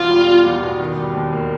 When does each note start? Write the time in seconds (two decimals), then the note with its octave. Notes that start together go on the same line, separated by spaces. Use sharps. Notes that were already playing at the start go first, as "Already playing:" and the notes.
Already playing: E2 B2 F4
0.10 G3
0.27 G3
0.44 E2
0.62 B2
0.80 D#3
0.97 G3
1.14 D#2
1.33 A#3